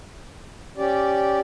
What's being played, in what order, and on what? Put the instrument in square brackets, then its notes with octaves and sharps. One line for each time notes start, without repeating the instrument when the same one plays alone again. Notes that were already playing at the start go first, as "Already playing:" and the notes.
[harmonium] C#4 G4 D5